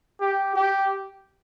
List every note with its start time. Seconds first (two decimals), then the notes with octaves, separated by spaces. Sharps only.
0.21 G4
0.56 G4